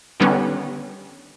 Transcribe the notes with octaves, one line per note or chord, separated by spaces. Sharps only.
D3 D#3 G3 B3 C#4